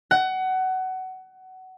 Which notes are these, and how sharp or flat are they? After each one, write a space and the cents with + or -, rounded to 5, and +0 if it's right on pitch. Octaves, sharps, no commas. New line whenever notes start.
F#5 +20